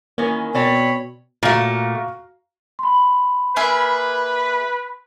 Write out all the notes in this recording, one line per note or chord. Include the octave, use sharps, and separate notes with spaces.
D#3 E3 A#3 C#4
B2 C4 C#5 D5 A5 B5
A#2 A3 F#4 F5 A#5
B5 C6
A#3 G#4 B4 E5